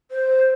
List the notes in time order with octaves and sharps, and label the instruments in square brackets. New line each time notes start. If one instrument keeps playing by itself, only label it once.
[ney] C5